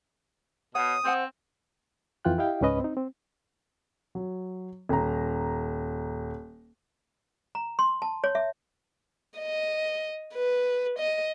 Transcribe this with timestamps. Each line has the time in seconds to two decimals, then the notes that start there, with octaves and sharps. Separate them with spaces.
0.75 B2 C#5 F#5 D#6
1.05 C4 C5 F#5 G#5
2.25 F2 E3 F4 G5 F#6
2.38 E4 G4 D#5 F5 G5
2.61 C#2 G#2 C#4 B4 D#5 B5
2.80 C4 D#4
2.97 C4
4.15 F#3
4.89 D#1 A#5
7.55 A#5
7.79 C6
8.02 A5
8.24 C#5
8.35 E5
9.38 D#5
10.34 B4
10.98 D#5